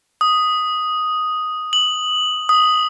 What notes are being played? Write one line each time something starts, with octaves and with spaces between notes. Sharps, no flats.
D#6
F#7
D#6